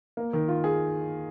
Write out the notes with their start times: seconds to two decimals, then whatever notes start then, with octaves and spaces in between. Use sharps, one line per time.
0.17 A#3
0.33 D#3
0.48 F4
0.64 G#4